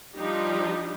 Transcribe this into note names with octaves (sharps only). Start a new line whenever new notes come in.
F3 G3 D4 D#4 G4